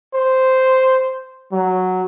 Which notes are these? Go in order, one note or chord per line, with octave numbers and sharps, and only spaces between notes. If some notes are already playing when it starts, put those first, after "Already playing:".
C5
F#3